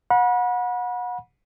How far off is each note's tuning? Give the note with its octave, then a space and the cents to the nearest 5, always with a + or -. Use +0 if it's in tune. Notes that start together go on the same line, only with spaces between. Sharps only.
F#5 -30 B5 -35